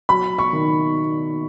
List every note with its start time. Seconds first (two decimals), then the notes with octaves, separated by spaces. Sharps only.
0.09 F#3 B5
0.38 C#6
0.53 D#3